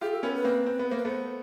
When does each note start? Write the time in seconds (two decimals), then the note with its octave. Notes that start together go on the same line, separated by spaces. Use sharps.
0.01 F4 G4 G#4
0.12 A4
0.23 B3 C#4 A#4
0.34 B4
0.44 A#3 C4
0.66 C4
0.79 B3
0.88 A#3 C5
0.97 B4
1.05 A3 B3 C5